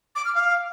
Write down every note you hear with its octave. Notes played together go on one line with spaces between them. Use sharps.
D6
F6
F5